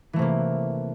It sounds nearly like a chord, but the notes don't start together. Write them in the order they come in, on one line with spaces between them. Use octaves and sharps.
E3 A3 C3 A#3